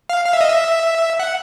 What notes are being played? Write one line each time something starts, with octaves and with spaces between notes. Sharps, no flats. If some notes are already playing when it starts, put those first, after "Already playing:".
F5
F5
E5
D#5
E5
F#5